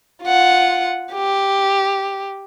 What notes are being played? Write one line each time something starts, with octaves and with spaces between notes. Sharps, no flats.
F4 F#5
G4